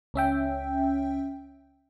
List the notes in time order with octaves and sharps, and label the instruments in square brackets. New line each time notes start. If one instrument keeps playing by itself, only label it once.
[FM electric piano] C#2 C#4 E5 G5